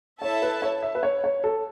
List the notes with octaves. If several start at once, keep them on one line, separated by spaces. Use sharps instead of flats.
E4 A4 C#5 E5 A5
B4
C#5
E5
B4
C#5
C#5
A4